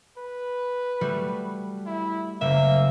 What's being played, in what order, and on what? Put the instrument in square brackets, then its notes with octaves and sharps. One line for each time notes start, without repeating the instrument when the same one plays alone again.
[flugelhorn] B4
[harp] G3 A3 F#4
[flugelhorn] E4
[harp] F#1 [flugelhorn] A#3 [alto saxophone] E5